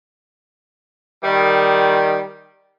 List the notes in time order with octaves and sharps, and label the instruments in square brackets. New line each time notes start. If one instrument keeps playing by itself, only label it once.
[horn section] D#3 G3